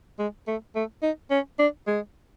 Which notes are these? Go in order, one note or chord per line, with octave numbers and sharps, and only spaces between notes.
G#3
A3
A3
D#4
C#4
D4
G#3